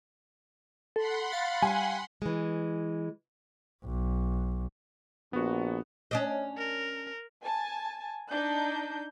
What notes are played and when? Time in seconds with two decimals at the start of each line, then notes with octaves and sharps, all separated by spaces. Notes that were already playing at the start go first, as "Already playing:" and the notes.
0.96 A4 F#5 B5 C6
1.32 F5 A6
1.62 G3 G#5
2.22 E3 G#3
3.85 B1
5.33 A#1 B3 F#4
6.11 C#4 D4 D#5
6.57 A#4
7.43 G#5 A5
8.30 D4 D#4 G6